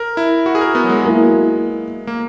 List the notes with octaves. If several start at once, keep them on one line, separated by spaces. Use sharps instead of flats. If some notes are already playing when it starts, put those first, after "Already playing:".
Already playing: A#4
E4
F#4
G#4
A#4
B3
F#3
G#3
F#3 A#3 E4
A#3